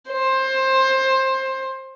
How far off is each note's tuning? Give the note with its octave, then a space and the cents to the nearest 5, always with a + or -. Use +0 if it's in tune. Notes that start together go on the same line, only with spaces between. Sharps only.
C5 +20